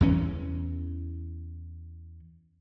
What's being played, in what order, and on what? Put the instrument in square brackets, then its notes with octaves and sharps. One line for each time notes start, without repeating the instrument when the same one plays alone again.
[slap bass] E2 E3 C#4